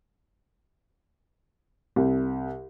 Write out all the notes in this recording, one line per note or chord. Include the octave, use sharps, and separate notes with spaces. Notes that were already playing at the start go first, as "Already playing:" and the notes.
C2